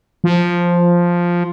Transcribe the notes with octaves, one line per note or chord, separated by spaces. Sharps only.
F3